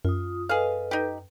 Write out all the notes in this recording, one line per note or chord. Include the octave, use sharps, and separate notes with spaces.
F#2 F4 D#6
G#4 A4 B4 D#5 F5
D#4 G4